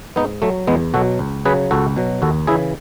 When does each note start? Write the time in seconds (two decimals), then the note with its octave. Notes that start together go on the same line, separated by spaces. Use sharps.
0.16 G#2 B3 D#4
0.42 F#3 A3
0.67 E2 G#3 B3
0.94 B2 F#3 F#4 A4
1.19 C#2
1.45 C#3 F#3 G#4 B4
1.71 C#2 F#4 A4
1.96 B2 F#3
2.22 D#2 F#4 A4
2.47 C#3 E3 E4 G#4